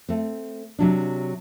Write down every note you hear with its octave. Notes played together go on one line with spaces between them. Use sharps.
A3 C4
C3 F#3 D4